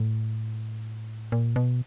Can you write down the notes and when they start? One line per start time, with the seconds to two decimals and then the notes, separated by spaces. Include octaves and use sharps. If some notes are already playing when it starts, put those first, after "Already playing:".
Already playing: A2
1.32 A#2
1.56 B2